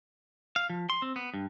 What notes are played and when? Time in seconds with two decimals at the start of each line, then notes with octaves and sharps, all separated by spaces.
0.56 F5
0.70 F3
0.90 C6
1.02 C4
1.16 B3
1.34 G2